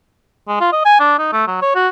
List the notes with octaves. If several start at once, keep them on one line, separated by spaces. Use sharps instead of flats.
G#3
F4
D#5
G#5
D4
D#4
A3
F#3
C#5
F#4